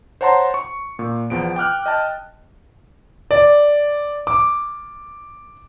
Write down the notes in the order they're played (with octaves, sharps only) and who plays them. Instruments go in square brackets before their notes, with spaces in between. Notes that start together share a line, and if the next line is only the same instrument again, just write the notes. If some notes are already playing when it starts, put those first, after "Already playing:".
[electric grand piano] C5 C#5 F#5 A5 A#5 C6
C#6
A#2
E2 F3 B3 D7
G5 D6 F6 F#6
D#5 G5 A5
[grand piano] D5
D6